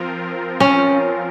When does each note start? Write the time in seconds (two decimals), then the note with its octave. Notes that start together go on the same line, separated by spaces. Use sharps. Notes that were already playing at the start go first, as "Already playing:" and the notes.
Already playing: F3 C4 F4 A#4
0.60 C#4